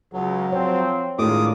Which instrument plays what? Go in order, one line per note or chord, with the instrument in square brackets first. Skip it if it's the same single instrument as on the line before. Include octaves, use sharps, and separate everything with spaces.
[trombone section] C#2 [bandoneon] F#3
[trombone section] F3 C4 [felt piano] C#5
[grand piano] A2 G#3 A3 [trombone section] D#3 D4 F4 [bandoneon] D6 D#6